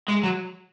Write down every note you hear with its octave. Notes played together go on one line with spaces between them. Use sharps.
G#3
F#3